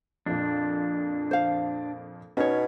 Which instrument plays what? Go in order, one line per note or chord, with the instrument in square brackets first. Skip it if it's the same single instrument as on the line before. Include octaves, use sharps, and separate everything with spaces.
[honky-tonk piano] F2 A#2 [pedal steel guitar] D4
[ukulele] C5 F5
[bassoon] B2 [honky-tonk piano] C#4 [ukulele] D#4 C#5